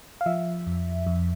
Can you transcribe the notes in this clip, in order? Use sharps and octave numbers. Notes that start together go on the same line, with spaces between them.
F5
F3 E5
F2
F2